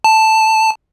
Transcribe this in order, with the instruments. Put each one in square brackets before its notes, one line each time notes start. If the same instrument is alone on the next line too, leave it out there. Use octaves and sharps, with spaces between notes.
[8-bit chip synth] A5